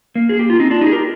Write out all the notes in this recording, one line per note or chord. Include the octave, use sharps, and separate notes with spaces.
A#3
G#4
G4
F4
C4 D#4
D4 F4
D#4 G4
G#4
G4 A#4